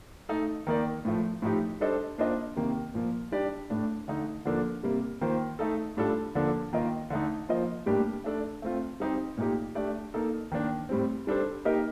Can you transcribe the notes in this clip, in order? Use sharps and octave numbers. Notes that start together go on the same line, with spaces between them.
A3 D#4 A4
D#3 A#3 D#4 A#4 D5
A2 F3 A3
A2 F3 A3 D#4 G4
G3 D4 A4 C5 D#5
A#3 D4 F4 C5 D#5
C3 D#3 A#3
A#2 F3 A#3
G3 D4 G4 D5
A2 A3 D4
D3 A3 D#4
D3 F3 A#3 D4 A4
C3 G3 A#3
D#3 A#3 F4 C5
A3 D#4 A4
A2 G3 D4 F4 A4
D3 F3 A#3 D4 A4
D#3 A#3 F4 A#4 D#5
D3 A3 D#4
F3 A#3 F4 C5 D#5
A2 G3 A#3 D4 G4
A3 D4 A4 D5
A3 C4 F4
G3 C4 D#4 G4 C5
A#2 A3 D#4 G4
A3 D4 G4 D5
A#3 D#4 A4
D#3 A#3 D4
A2 G3 C4
G3 D4 A4 C5
A#3 D#4 G4 A#4 D#5